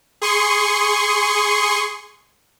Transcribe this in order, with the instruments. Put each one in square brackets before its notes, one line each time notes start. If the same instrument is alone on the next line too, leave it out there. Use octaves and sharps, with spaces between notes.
[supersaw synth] G#4 C6 C#6